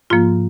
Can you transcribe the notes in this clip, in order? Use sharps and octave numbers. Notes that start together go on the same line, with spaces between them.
G#2 F3 A#3 F4